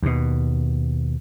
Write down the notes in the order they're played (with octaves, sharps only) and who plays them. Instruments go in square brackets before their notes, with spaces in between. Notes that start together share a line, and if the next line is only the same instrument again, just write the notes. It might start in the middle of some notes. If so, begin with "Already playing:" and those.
[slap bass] D#2 B2